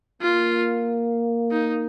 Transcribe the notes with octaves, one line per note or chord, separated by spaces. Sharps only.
A#3 F4
D#4